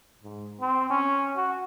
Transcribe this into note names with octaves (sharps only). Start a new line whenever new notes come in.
G#2
C4
C#4
F#4